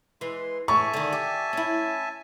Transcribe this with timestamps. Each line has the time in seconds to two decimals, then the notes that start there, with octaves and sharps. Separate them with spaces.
0.21 E3 G#3 C6
0.68 A2 E5 G#5 A5 C#6
0.93 D3 D#3
1.13 G4
1.53 C#4 E4